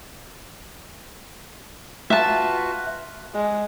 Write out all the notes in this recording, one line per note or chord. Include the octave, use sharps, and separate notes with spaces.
F4 F#4 B4 E5 A5
G#3